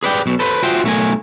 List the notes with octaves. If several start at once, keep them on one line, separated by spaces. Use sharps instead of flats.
G#4 B4 D5 G5
B1 B2
A4 B4 C5
F4 F#4 G#4 C5 E5 G5
B1 A3 A#4 G#5